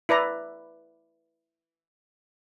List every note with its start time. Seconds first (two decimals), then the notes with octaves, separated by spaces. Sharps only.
0.09 E4 B4 D5 A#5